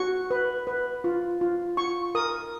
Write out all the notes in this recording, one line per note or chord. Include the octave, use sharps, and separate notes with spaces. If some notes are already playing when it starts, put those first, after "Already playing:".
Already playing: F#4 C#6
B4
B4
F4
F4
F4 C#6
A#4 D#6